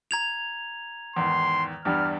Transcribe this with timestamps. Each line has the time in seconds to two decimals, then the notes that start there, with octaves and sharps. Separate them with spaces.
0.11 A#5 G#6 F7
1.16 E2 G#2 D#3 C6
1.85 E2 G2 G3 F6